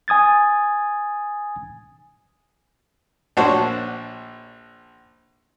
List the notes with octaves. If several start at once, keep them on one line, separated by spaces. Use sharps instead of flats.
G#5 D#6 G#6 A6
A#1 D4 F#4 C5 C#5